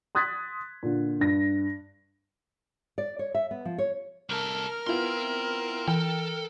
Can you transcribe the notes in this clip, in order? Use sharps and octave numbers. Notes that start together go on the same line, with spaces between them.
C6 D#6 F#6 G#6 A6 B6
A#2 D3
G2 A#6
D5
C#5
E5
B3
F3
C#5
C2 A4 A#4 F6
B3 E4 F4 G5 C6
E3 A4 G5